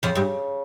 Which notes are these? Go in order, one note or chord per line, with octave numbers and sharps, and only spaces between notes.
F2 C#3 F3
G2 G3